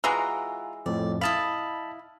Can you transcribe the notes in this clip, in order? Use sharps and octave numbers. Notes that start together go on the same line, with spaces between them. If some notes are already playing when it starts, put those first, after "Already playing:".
E3 G#3 F4 F#4 A#5
F2 A2 D5
E4 D#5 F5 A5 B5